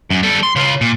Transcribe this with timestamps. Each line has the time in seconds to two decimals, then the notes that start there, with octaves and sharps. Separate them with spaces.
0.10 F#2
0.23 G3 A4
0.43 C6
0.56 C#3 F4
0.81 A#2